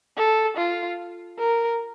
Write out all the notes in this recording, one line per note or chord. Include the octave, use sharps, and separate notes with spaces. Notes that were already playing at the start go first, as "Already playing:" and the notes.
A4
F4
A#4